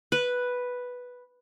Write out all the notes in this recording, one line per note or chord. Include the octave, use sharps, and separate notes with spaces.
B4